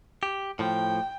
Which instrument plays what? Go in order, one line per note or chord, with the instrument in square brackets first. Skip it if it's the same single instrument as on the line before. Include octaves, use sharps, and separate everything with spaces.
[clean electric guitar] G4
[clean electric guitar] A2 F3 [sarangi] G5